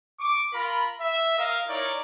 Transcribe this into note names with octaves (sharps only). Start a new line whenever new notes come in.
C#6 D6
F4 A#4 B5
E5
A#4 D#5 F5
D#4 E4 A#4 C#5 D5